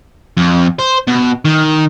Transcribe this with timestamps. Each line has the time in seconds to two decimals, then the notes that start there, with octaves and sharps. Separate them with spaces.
0.37 F2
0.79 C5
1.08 B2
1.45 D#3